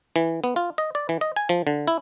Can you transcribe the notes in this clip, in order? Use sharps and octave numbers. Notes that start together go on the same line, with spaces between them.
E3
B3
F4
D#5
D5
E3
D#5
G#5
F3
D3
E4